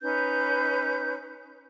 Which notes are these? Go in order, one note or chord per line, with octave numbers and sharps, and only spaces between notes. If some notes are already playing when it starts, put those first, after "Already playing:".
C#4 D#4 B4 G6